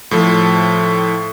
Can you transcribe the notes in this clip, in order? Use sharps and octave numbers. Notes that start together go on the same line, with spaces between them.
A2 F3 A4